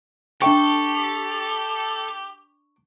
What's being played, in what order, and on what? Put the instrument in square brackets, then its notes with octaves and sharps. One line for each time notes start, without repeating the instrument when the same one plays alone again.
[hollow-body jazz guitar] D4 E5 G5 [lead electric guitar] G4 [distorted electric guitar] A4 [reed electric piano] C#6